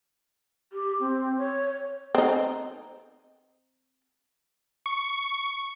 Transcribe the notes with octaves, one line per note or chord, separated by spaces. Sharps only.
G4
C4
C#5
C4 D#4
C#6